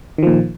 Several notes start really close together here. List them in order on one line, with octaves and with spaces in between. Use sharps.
D#3 F3 A#2